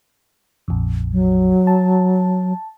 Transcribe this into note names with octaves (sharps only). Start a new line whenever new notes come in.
A#1 F2
F#3
A5